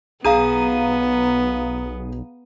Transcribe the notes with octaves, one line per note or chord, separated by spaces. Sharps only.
B1 B3 G#4 F5 A#5 D#7